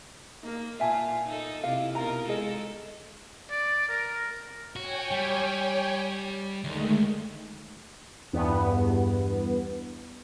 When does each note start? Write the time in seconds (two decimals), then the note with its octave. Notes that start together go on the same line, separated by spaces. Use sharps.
0.43 A#3 D#4 A#4
0.80 A#2 F4 E5 G#5 A5
1.27 D#4 A4 D#5
1.63 C3 E4 F4 F5
1.95 B2 D#4 F4 A#4 A#5
2.28 G#3 G#4 A4 D#5
3.50 D5
3.88 A#4
4.76 F#4 C#5 G5 G#5
5.11 G3
6.64 D2 D#3 G#3 A3
8.33 E2 G2 B3